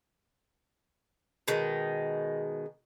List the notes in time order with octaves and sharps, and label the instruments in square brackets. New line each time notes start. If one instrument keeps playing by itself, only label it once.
[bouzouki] B2 D#3 G#3